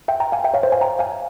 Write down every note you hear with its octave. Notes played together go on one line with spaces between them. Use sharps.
E5 G5
G5 A#5
F5 G#5
E5 G5
C#5 F5
C5 E5
F5 G#5
G5 A#5
F5 G#5